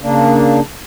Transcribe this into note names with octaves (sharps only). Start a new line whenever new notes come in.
C#3 A#3 D4